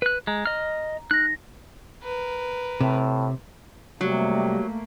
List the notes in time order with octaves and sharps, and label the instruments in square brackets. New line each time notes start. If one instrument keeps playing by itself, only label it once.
[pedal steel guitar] B4 F#6
[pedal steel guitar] G#3 [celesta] A#5
[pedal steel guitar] D#5 F6
[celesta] D#4 A#6 [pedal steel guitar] F#6
[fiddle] A#4 B4
[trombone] A2 [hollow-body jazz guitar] C3
[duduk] C3 [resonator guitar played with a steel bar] F#3 [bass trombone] G3 [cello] A3 A#3